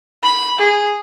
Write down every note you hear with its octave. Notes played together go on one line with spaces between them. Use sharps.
B5
G#4